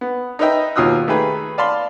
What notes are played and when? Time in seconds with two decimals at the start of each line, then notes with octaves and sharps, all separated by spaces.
0.01 B3
0.39 D#4 A#4 B4 D#5 E5 G5
0.76 D#2 B2 F4 D#6 E6 F#6
1.07 D#3 A3 G4 G#4 B4
1.58 D5 F5 A5 B5 C6